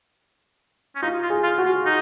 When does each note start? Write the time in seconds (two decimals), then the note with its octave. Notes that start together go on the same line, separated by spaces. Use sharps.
0.95 C#4
1.02 D#4 F4
1.23 F4
1.30 G#4
1.44 F4
1.58 F#4
1.65 F4
1.86 D#4